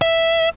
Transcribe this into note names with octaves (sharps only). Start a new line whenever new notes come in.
E5